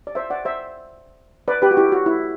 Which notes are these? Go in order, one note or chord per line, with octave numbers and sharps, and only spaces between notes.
D5
C5 E5
D5 F#5
C5 E5
B4 D5
G4 B4
F#4
E4 G4
F#4
E4